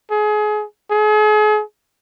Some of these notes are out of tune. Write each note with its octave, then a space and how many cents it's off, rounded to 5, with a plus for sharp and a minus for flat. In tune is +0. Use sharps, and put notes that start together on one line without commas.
G#4 +30
G#4 +40